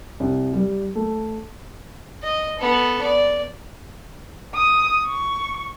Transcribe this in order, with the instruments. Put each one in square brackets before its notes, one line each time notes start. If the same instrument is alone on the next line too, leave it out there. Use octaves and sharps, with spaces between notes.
[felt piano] C2
G3
A3
[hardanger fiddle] D#5
B3 A4
D5
[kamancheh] D#6
C#6